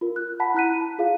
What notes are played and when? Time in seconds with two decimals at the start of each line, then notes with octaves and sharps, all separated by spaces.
0.01 F4 A#4
0.16 F#6
0.40 F#5 A5 B5 B6
0.54 E4 A#5 F#6 B6 D#7
0.81 A5
0.98 F4 G#4 C#5 F5